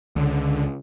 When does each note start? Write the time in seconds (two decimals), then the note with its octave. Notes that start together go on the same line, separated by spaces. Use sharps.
0.16 C#2 D3